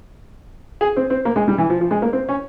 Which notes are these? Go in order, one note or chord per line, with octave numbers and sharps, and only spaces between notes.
G#4
C4
C4
A#3
G#3
G3
E3
F3
F3
G#3
A#3
C4
C#4